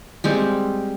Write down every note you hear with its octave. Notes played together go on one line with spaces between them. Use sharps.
G3 G#3 C4